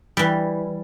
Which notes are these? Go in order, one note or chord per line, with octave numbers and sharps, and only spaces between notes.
E3 G3